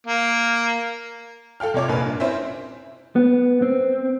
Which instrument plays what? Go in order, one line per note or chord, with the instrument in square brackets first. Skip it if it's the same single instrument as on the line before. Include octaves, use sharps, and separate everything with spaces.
[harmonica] A#3
[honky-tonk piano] A4 F5 G5 F6
C3 F4 C#5 D6
F1 A#1 A#3 B4 G#5
G2
C4 C#4 E4 C5 E5
[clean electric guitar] B3
C4